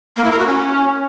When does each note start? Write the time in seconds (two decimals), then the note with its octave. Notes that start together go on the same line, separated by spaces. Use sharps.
0.17 A#3
0.24 E4
0.32 A#4
0.39 F#4
0.46 C#4